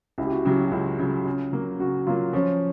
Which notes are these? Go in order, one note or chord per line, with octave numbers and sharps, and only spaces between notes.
C#2 E4
G4
F#4
C#3 F#3 G4
F#4
C#2 F4
C#3 F#3
C#3
F#3 A#3
C#3 F#4
F#3 A#3 F4
F3 C#4